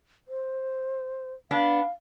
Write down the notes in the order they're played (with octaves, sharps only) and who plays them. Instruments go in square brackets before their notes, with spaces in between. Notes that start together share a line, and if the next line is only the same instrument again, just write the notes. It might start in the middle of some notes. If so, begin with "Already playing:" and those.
[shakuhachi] C5
[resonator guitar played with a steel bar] B3 D4 [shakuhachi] F5